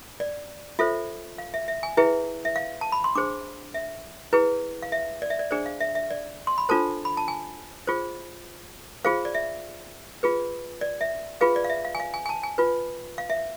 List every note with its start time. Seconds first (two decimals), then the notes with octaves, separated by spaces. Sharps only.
0.20 D5
0.79 F4 A4 C5 E5
1.38 F5
1.54 E5
1.68 E5
1.83 G#5
1.97 E4 G#4 B4 E5
2.45 E5
2.56 F5
2.81 A5
2.92 B5
3.04 C6
3.15 D4 G#4 C5 D6
3.74 E5
4.33 E4 G#4 B4
4.82 F5
4.92 E5
5.22 D5
5.30 E5
5.39 D5
5.51 D4 G#4 C5 D5
5.66 F5
5.80 E5
5.95 E5
6.10 D5
6.47 C6
6.58 B5
6.69 D4 F4 A4 C5 A5
7.05 B5
7.17 A5
7.28 G#5
7.87 F4 G#4 C5
9.05 F4 G#4 C5 F5
9.25 D5
9.34 E5
10.23 F4 G#4 B4
10.81 D5
11.01 E5
11.41 F4 G#4 B4 F5
11.56 D5
11.64 F5
11.70 E5
11.85 F5
11.95 G#5
12.00 F5
12.14 G#5
12.26 G#5
12.29 A5
12.43 G#5
12.58 F4 B4
13.18 F5
13.30 E5